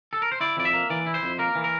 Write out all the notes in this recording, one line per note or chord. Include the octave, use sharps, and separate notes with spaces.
A4
A#4
C5
E4 D5
F2 D5
E5
A#3
E3 D5
E4
C5
F2
A#3 A#4
E3
A#4